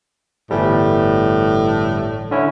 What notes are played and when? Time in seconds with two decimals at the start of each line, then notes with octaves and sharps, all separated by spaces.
0.51 G1 A2 E3 G3
2.31 D3 C#4 E4